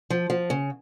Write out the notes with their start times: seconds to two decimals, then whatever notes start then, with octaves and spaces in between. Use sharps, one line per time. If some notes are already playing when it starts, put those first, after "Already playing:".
0.10 F3
0.30 F3
0.50 C#3